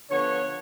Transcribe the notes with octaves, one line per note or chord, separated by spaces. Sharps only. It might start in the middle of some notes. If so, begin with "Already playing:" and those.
D3 F3 B3 C#5